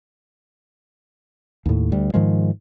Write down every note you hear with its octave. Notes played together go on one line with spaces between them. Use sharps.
D#2 A2
D2 G3
G#2 D#3 F3 G#3